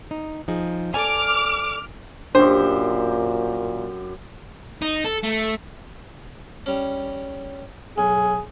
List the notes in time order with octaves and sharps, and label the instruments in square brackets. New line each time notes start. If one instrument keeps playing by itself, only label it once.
[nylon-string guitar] D#4
F3 D#4 G#4
[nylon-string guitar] A4 D5 G#5 [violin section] D6 F6
[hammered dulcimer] F#2 G4 [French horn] A#2 [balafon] D4 [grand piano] C5
[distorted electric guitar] D#4
A4
A3
[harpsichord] G3 C#4
[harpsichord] B1 [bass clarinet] G#4